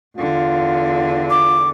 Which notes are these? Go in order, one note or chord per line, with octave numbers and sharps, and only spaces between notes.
E2 D3 F4
D6